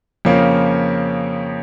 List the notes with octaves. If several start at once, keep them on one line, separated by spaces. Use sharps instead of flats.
F2 C#3 F3 A#3 C#4